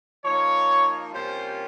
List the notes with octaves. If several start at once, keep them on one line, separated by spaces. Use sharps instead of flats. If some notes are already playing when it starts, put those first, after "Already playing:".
F3 A#3 D#4 C#5
C3 G3 A#3 C#4 F4 C5